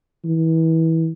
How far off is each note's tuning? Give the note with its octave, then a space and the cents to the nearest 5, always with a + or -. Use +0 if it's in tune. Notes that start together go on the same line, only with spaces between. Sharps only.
E3 -25